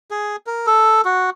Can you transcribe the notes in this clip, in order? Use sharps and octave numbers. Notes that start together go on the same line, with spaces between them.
G#4
A#4
A4
F#4